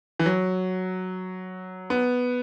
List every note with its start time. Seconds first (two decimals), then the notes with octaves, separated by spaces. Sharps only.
0.19 E3
0.26 F#3
1.90 B3